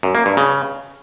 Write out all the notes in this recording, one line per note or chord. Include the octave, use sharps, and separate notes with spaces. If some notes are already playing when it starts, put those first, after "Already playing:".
F#2
A#3
G2
C#3